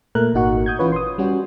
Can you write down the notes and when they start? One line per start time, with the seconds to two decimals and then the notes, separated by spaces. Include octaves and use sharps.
0.15 A#2 A3 A#4 F#6
0.34 G#1 A#2 D#4 F#4 F#5 C#6
0.66 D#6 G6 G#6
0.79 E3 C#4 F4 B4 C#5
0.92 C6 D#6
1.18 G3 C#4 F#4